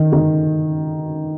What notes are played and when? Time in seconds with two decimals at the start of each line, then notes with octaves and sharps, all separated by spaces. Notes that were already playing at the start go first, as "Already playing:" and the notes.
Already playing: D#3
0.13 D#3